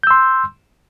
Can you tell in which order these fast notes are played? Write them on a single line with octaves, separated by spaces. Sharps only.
G6 E6 C6